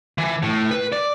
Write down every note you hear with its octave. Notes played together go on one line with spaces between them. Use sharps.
E3
A2
B4
D5